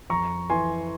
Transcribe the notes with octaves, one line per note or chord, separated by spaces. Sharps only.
F2 A#5 C#6
E3 G#5 C6